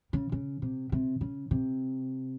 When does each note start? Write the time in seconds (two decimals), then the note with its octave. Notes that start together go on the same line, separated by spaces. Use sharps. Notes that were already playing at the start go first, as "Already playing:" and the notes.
0.13 C#3
0.32 C#3
0.62 C3
0.92 C3
1.21 C#3
1.51 C3